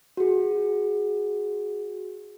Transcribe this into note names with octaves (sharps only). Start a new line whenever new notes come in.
F#4 G#4